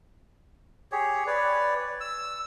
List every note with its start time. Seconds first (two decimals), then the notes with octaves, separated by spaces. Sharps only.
0.92 G4 G#4 C#5
1.27 B4 C#5 D5
2.01 E6